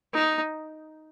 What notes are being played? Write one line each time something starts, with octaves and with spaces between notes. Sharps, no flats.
D#4